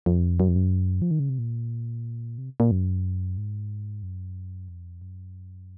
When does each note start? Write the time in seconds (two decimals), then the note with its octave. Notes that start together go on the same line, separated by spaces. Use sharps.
0.06 F2
0.40 F#2
0.48 F2
0.56 F#2
1.02 F3
1.11 D#3
1.19 C#3
1.29 C3
1.39 A#2
2.38 C3
2.60 A#2
2.71 F#2
3.37 G#2
4.03 F#2
4.68 F2
5.02 F#2